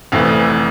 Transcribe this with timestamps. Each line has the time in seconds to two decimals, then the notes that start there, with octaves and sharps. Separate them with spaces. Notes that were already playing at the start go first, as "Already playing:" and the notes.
0.12 F1 F2 E3 A3